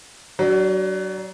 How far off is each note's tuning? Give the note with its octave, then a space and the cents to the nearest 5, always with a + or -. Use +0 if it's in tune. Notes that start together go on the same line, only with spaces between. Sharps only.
F#3 +30 D4 +0